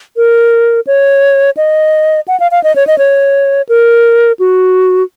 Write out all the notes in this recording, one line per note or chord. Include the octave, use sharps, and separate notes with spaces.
A#4
C#5
D#5
F#5
F5
F5
D#5
C#5
D#5
C#5
A#4
F#4